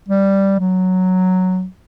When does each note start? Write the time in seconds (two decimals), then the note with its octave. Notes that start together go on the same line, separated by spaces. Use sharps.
0.09 G3
0.60 F#3